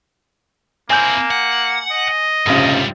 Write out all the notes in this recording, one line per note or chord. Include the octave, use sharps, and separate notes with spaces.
A#3 C4 E4 G#5 G6
F#5
D#5
F1 A#1 G#2 C#3 G3